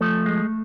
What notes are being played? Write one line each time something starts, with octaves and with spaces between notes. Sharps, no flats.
F3 A3 A4
G#3